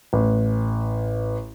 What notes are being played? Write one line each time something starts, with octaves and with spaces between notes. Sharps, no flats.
A1